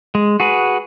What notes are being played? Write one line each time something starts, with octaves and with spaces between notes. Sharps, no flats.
G#3
F#4 G#4 B4